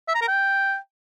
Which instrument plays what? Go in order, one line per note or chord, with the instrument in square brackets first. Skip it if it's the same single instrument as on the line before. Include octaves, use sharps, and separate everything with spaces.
[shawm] E5
A#5
A#4
G5